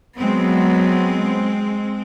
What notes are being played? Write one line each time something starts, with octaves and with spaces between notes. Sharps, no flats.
F#3 G#3 B3 C4